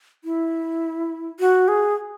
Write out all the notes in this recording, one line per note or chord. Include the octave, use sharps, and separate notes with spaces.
E4
F#4
G#4